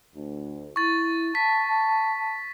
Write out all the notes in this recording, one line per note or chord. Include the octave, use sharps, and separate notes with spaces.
D2
E4 C#6 A6
A5 B6